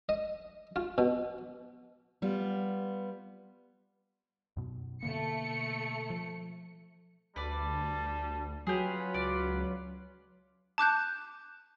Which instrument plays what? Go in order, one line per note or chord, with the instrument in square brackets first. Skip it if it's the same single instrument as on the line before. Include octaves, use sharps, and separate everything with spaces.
[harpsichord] D#5
F4
B2
[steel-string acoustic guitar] G3 B3 F4
[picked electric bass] F#2 B2
[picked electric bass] B2 D3 A#3 [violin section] A3 C#7
[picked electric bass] F3
[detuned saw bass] D2 [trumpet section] G3 A5 [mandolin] B4 D5
[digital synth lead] F#3 [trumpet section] C#4 F4 B4 [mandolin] G4 G#4
[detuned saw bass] C#2 [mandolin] D5
[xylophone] A5 D6 F#6 G6